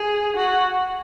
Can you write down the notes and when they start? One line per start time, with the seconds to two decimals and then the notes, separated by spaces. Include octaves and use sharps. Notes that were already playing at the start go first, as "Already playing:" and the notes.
Already playing: G#4
0.36 F#4